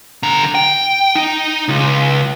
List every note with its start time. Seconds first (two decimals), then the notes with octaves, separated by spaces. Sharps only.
0.23 D3 A#5
0.55 G5
1.15 D#4
1.68 C#2